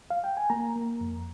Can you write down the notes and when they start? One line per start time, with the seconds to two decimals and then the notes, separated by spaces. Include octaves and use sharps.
0.10 F5
0.24 G5
0.37 G#5
0.50 A#3 A#5
0.75 A#3
1.01 F2